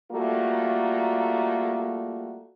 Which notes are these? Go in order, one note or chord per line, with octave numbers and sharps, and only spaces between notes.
G3 A3 A#3 F4 F#4